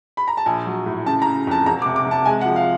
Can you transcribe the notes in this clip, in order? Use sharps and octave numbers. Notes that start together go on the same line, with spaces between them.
B5
A#5
A5
A#1 G#5
F#3
A2
C#3 A5
A#5
C#3
F2 A5
E1 A#5
D6
C3
D6
C3 A5
G#3 G#5
F#5
F3
F5